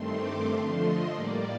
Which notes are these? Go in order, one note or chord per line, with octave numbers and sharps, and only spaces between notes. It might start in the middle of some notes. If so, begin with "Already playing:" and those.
Already playing: G2 D#3 A3 C4 C6
D6
D3 F3 A3 C6
D#5
A2 G3 A#3 D5